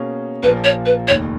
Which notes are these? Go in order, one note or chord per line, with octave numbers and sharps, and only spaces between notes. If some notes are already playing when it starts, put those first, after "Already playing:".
Already playing: B2 A#3 C#4 G#4
A#1 A#2 F3 A#3 B4
C#5
B4
F1 D#2 D#3 C#5